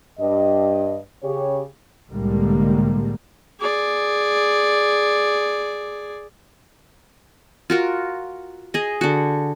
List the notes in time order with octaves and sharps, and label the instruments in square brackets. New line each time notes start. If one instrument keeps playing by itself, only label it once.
[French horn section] G2 D#5
C#3 G4 C#5
[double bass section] C2 A2 D3 G3 G#3 A#3
[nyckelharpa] G#4 D5
[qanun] F4 F#4 A#4
G#4 D#5
D3 F#4